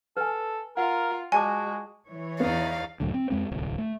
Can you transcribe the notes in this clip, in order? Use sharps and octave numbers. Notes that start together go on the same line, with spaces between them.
A4 B4 G#5
F4 A#4 F#5
G#3 F#4 D5 G#5 A5 D6
E3 C#5
E2 B3 D#4 D5 F5
C#2 F#2 A2 D3
C4
F2 G#3 C4
D1 C2
A3